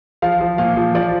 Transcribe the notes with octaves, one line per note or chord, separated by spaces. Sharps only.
F3 F5
F3
A#2 F5
F3
F3 D5